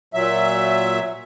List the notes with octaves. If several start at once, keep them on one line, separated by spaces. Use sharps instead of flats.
A#2 F#3 E5